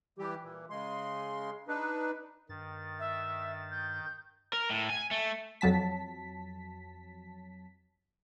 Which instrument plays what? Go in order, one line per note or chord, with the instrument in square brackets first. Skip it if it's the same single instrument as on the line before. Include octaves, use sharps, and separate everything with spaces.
[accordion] E3 G3 G4
A#2 E3
C#3 G#3 C6
D4 D#4 B4
[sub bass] G2 [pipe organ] D#3 A6
[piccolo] E5
G6
[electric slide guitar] A#4
A2
G#5
A3
[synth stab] F2 F#3 A5 B6